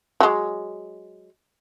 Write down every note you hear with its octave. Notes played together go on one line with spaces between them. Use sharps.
F#3 G#3